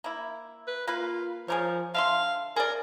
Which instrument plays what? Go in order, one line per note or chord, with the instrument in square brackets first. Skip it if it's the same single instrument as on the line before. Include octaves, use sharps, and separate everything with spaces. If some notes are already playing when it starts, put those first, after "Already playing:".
[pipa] A#3 E4
[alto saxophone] B4
[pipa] A#3 B4 [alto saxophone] F4
[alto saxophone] F3 [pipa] G#4 A#4 C#5
[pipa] D3 E5 C6 [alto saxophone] F5
[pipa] G#4 D5 [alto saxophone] A#4